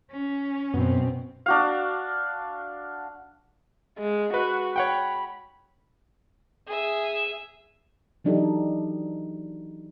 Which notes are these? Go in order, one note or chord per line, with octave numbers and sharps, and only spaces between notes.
C#4
F#2 B2 B3 C4
D4 F#4 F5
G#3
F#4 B4
C#5 F#5 G5 B5
G#4 E5
E3 F#3 D4 D#4 G4 A4